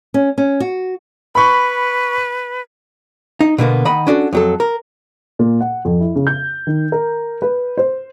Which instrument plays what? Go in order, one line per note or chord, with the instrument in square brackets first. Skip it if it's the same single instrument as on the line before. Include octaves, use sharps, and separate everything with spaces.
[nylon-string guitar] C#4
C#4
F#4
[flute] B4 [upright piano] B5 C#6
[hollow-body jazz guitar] D#4
B2 D3 A#3 B3
D#3 D#5 F#5 B5
C#4 D4 F#4 A4
F2 F#3 A4
A#4
[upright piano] A#2
F#5
F2
E4
C#3
G6
D#3
A#4
B4
C5